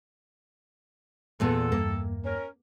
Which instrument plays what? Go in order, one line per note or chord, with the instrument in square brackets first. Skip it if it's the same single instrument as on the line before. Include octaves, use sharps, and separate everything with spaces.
[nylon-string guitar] E2 A#2 B3 [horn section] A4
[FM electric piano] E2 G2 [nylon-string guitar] A#3
[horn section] C#4 A#4